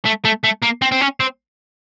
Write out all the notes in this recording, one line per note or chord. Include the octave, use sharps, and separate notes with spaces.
A3
A3
A3
A#3
C4
C4
C#4
C4